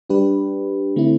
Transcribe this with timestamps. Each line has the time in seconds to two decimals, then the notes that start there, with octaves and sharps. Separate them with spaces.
0.10 G3 D4 G4 B4
0.96 D3 A3 C4 E4